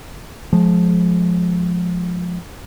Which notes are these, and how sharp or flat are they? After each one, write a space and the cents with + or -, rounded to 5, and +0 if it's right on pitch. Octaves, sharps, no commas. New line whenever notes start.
F3 +15 G#3 +30